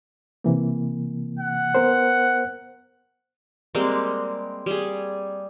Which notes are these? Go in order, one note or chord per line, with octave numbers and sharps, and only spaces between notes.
C3 E3 A#3
F#5
B3 A#4 C5
G3 G#3 A#3 C4
G3 G#4